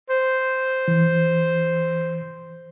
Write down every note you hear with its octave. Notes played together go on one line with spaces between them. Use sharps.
C5
E3